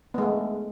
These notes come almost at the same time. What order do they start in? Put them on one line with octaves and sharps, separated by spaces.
B3 G#3 A3